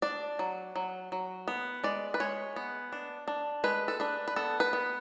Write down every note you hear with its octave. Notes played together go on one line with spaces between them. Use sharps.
D4 D5
F#3
F#3
F#3
B3
G#3 D5
B4
G#3 C#5
B3
D4
D4
G#3 B4
A4
D4 B4
B4
B3 A4
B4
B3